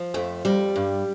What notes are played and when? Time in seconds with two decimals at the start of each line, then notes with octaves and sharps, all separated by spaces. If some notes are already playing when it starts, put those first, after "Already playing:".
Already playing: F3
0.14 F2 A3
0.45 F2 G3
0.76 G2